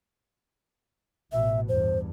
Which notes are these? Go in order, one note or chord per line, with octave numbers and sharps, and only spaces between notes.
A1 B2 E5
E2 G2 C5